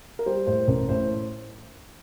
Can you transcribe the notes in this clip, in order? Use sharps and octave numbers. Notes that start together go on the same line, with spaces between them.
A#4
G3 C5
A2 C5
A1 A#4
A2 C5